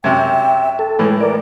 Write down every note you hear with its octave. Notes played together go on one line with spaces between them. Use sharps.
F#2 C3 E5 G5
A4
A2 E3 G#3
A#4 B4 D5